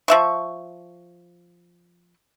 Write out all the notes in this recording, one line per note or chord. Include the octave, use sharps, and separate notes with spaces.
F3 E5 C#6